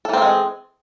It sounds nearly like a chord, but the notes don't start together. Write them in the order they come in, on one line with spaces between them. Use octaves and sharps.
A4 E3 C4 A#3 G#3